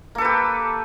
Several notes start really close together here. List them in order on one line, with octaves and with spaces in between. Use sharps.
A#3 A4 B4 G4